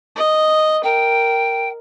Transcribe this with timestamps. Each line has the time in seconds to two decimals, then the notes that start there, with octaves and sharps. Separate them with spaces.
0.16 D#5
0.83 A#4 G5